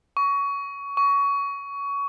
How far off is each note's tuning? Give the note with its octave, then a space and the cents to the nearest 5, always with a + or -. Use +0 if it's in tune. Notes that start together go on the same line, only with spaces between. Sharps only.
C#6 +20
C#6 +20